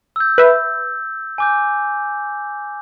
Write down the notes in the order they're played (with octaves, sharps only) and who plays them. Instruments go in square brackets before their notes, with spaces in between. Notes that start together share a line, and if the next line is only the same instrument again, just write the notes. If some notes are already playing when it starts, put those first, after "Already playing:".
[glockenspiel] E6 G6
[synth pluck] B4 E5
[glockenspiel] G#5 D6 G6